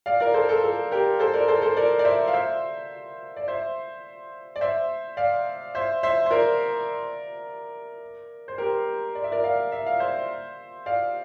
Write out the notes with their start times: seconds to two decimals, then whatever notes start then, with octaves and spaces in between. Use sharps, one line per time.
0.06 D5 F5
0.20 A#4 D5
0.34 A4 C5
0.49 A4
0.64 A4
0.91 G4 A#4
1.20 A4 C5
1.34 A#4 D5
1.48 A4 C5
1.62 A4 C5
1.77 A#4 D5
1.99 D5
2.05 C5 E5
2.28 F5
2.33 C5 E5
3.37 D5
3.48 C5 E5
4.56 D5
4.61 C5 E5
5.17 D5 F5
5.75 C5 E5
6.03 C5 E5
6.26 C5
6.31 A#4 D5
8.48 C5
8.58 G4 A#4
9.15 D5
9.24 E5
9.32 A#4 D5
9.44 D5 F5
9.72 E5
9.86 F5
9.99 C5 E5
10.86 D5 F5